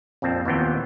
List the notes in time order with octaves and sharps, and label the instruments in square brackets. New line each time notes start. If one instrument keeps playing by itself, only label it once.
[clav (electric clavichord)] A#1 F2 C4 A5
D#2 A#2 E3 B3 C4 G5